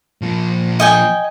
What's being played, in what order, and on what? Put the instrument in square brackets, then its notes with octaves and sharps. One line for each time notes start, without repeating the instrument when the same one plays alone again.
[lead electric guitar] A#2 F3
[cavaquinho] D#5 G5 G#5